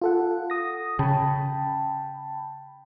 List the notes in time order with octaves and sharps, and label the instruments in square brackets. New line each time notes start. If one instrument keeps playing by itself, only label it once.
[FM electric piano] F4 A4 F#5
D#6 A#6
[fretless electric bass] C#3 [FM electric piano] G5 A5 B5